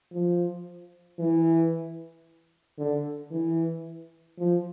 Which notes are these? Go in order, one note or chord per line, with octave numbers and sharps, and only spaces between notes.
F3
E3
D3
E3
F3